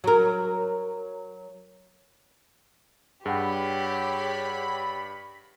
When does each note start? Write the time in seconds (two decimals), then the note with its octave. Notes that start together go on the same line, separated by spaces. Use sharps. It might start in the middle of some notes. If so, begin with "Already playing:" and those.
0.04 F#3 A#4
3.26 G2 G4 G#4 C#5 F#5 G5 B5